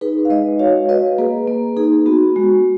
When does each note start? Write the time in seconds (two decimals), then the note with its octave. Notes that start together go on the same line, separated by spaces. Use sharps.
0.01 D#4 G#4 B4
0.25 F5
0.30 G#3 B4 D#5
0.59 F#4 C#5 F5
0.89 F#4 B4 D#5
1.18 A#3 G#4 B4
1.48 A#3
1.77 D#4 G#4
2.06 B3 F#4
2.36 G#3 F#4